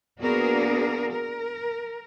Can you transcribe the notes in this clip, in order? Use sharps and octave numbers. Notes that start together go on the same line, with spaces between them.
A#3 B3 D4 F#4 G#4 A#4
A#4